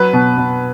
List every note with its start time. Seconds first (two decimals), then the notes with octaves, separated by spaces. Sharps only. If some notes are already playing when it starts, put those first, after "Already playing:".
Already playing: F#3 B4
0.13 B2
0.37 B2